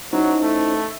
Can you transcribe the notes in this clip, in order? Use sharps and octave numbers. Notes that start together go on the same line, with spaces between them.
F#3 C#4 D#4 E4 C5
A3